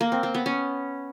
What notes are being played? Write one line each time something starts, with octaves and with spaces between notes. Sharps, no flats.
A#3
C4
C4
B3
C#4